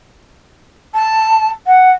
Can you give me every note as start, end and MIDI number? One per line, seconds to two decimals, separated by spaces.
0.94 1.49 81
1.67 1.91 78